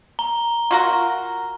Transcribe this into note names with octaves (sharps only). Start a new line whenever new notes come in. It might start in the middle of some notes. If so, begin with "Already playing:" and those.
A#5 G7
F4 F#4 A#4